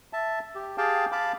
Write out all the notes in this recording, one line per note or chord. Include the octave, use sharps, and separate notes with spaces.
E5 A5
G4
G4 G#4 F5 G5 A5
F5 A5 B5 D6